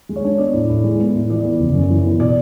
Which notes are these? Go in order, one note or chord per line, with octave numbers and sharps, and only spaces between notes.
G#3
C#5
D4
B3 D5
A2
A2
G#3
B3
A2
E3 D5
B3
F#1
F#2
E3
B3
B2 D5